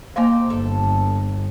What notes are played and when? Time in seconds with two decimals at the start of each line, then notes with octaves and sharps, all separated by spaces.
0.16 A#3 D#4 G4 C5 F5
0.50 G1 A4